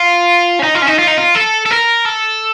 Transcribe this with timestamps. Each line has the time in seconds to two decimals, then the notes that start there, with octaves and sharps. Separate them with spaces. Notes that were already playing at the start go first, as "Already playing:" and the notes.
Already playing: F4
0.60 C#4
0.64 D#4
0.75 F4
0.82 C#4
0.88 D#4
0.99 F4
1.08 D#4
1.18 F4
1.35 A4
1.66 A4
1.71 A#4
2.06 A4